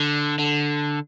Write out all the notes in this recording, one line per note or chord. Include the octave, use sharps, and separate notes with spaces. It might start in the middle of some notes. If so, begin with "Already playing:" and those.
Already playing: D3
D3